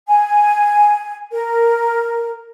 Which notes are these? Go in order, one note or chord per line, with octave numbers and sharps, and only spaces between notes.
G#5
A#4